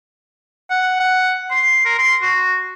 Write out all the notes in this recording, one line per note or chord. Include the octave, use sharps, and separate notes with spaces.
F#5
F#5
C6
A#4
C6
F#4